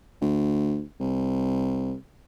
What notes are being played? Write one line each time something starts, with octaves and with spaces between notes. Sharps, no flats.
D2
C2